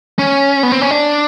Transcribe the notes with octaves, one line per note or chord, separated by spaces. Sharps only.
C#4
B3
C4
C#4
D4